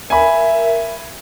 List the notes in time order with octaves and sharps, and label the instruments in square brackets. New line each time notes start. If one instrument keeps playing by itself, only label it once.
[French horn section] A#4 [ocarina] E5 [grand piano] G#5 B5